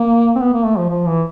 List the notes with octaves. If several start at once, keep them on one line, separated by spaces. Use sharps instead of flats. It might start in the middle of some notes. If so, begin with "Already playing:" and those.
Already playing: A#3
C4
B3
A#3
A3
F3
F3
E3